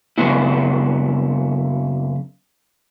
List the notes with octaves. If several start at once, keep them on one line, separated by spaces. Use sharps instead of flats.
F#2 C#3 B3 E4